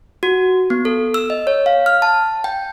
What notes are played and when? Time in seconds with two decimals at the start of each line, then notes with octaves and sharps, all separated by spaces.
0.23 F#4
0.70 B3
0.85 A4
1.14 E6
1.30 D#5
1.47 C#5
1.66 F5
1.86 F6
2.02 A5
2.44 G5